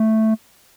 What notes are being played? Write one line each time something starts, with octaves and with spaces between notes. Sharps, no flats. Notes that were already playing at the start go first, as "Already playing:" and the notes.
Already playing: A3